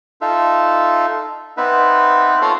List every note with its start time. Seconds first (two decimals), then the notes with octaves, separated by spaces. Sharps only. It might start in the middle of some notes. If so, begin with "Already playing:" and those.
0.21 D#4 F4 A4 E5
1.57 B3 C4 D#4 B4 E5
2.42 F4 A4 C#5 F5 A#5 C6